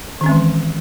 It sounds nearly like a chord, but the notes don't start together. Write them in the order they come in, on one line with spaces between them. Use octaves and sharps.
D#3 C#4 C4 G#3 E3